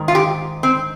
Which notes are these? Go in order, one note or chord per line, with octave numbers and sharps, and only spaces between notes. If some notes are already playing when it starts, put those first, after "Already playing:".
Already playing: G#2 D#3
F4
G4
C4